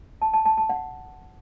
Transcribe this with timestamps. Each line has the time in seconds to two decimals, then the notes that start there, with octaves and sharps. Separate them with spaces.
0.22 A5
0.34 A5
0.45 A5
0.57 A5
0.69 F#5